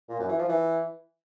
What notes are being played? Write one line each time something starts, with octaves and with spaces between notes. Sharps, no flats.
A#2
F#2
E3
F3
E3